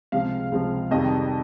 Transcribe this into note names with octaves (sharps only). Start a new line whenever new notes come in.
C#2 C3 F3 G#3 F5
C#2 C3 F3 G#3
F2 C3 D#3 G3 D#5